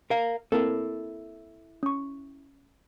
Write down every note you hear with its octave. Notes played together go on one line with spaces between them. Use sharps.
A#4 F5
A#3 C4 E4 A4 A#4
C#4 C#6